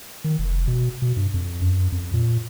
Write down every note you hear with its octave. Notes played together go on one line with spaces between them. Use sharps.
D#3
F1
B2
B2
G2
F2
F#2
F2
A#2